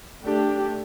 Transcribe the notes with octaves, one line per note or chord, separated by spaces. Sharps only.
A3 D4 G4